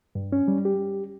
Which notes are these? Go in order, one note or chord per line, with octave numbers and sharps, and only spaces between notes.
G2
C#4
G3
G4